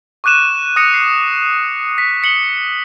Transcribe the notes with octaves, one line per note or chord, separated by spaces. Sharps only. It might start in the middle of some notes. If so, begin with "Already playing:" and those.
C#6 D6 F#6 D#7 E7
D#6 A#6 C#7
C7
B6
B6 C#7 F#7 G7